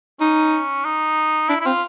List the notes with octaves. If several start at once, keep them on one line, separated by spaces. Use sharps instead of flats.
C#4 D#4
D#4
D4 E4
E4
C4 F4